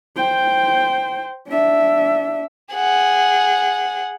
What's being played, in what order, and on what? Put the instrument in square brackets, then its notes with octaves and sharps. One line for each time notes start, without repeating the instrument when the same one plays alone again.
[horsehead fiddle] C5 G5
D4 E5
[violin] G#4 F#5